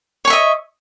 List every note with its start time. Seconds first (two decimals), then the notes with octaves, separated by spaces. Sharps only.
0.25 C#5
0.27 C#6
0.30 E5
0.33 D#5